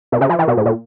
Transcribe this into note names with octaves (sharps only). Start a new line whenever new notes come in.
B2
C#3
F3
E3
B2
A2
A#2